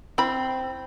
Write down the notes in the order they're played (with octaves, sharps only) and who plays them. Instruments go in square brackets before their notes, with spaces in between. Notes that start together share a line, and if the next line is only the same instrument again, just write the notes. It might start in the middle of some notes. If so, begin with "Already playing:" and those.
[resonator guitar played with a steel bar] C4 [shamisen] E4 B5